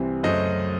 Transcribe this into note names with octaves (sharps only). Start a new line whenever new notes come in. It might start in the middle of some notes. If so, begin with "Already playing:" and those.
Already playing: C2 C3 E3 C4
F#2 C#3 F#3 A3 C5 D#5